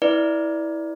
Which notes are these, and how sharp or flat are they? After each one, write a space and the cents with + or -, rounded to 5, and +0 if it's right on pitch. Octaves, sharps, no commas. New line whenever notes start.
E4 -15 B4 +0 D5 +0